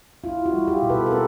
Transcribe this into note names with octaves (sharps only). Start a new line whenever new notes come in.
E4 F4
E4 F#4
G3
F4 G4
B2
A4 B4
A4
C4 G#4 A#4